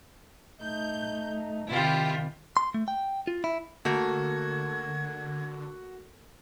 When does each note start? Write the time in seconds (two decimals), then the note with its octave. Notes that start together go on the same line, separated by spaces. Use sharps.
0.61 A3 D#4 G6
1.69 C3 D#3 E4 F4 G4
2.57 C6
2.74 A3
2.88 G5
3.27 F4
3.44 E4
3.85 D3 A3 A#3 F#4 G#6